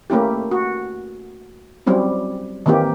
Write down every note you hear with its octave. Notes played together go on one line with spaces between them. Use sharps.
A3 A#3 C#4 E4 G4
F#4
F#3 G3 C4 C#4 E4
D#3 E3 A#3 C4 G4